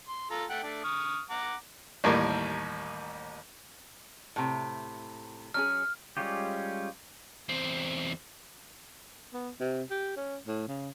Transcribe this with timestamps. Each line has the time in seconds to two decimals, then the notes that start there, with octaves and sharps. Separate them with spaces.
0.09 C6
0.31 F4 A4 A#5
0.50 A3 F#5 G5
0.63 A3 D4
0.84 C#6 D#6 F6
1.30 F#5 A#5 D6
2.04 A1 D#2 A2 G3 A#4
4.36 A2 C3
5.54 F#3 C#4 G#4 F6
6.17 G3 G#3 C#4 F4 G4
7.49 E2 C4
9.34 B3
9.61 C3
9.91 G4
10.17 C#4
10.47 A2
10.68 C#3